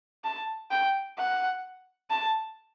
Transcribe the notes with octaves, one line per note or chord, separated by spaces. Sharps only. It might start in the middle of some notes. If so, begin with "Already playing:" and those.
A5
G5
F#5
A5